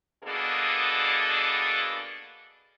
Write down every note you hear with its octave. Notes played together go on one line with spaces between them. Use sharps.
B2 A#3 B3 D4 G#4 A4